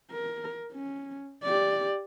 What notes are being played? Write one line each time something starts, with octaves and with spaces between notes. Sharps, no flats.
A#4
C#4
G4 D5